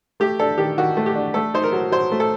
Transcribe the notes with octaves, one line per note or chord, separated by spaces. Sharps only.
A3 G4
D4 A4
D#3 G4
D#3 F#4
A3
G4
D4
A3 A4
D#4 C5
A#4
F#3
F#3 C5
A3
A4